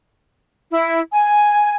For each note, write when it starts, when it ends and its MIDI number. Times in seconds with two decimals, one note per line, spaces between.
0.71 0.99 64
1.13 1.76 80